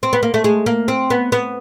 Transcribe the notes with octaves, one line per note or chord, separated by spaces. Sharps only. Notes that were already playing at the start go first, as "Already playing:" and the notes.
C4
B3
A#3
A3
G#3
A#3
C4
B3
B3